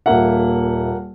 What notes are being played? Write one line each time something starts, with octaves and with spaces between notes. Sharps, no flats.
D#1 A#3 E5 F#5